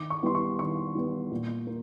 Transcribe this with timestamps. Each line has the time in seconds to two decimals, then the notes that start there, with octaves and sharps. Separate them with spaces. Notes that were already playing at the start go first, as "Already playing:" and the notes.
Already playing: D#3 D6
0.10 C#6
0.23 G3 B3 C6
0.35 C#6
0.59 D#3 C#6
0.95 G3 B3
1.32 A#2
1.67 A#3